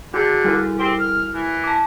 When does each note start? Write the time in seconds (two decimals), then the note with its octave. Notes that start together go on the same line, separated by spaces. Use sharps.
0.14 D3 F#4 G#4
0.44 G3 E4 A#4
0.79 C4 G4 C5
1.00 F6
1.33 E3
1.64 A5 D6